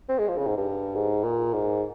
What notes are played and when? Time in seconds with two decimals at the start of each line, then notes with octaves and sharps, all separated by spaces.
0.09 C4
0.19 G#3
0.28 F3
0.37 C#3
0.47 G#2
0.57 G2
0.95 G#2
1.24 A#2
1.53 G#2